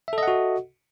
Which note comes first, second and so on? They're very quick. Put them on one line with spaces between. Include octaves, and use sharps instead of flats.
E5 A4 D#5 F#5 F#4